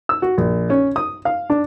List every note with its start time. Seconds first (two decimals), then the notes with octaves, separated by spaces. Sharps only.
0.09 E6
0.22 F#4
0.38 A#1
0.70 C#4
0.96 D#6
1.25 F5
1.50 D4